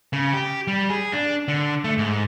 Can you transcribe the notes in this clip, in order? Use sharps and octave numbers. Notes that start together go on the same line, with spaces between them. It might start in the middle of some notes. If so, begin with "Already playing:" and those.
C#3
G4
G3
G#4
D4
D3
A3
G#2